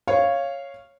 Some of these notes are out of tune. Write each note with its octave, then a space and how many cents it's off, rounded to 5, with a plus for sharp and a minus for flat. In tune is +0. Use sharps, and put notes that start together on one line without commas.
C#5 -5 F5 -10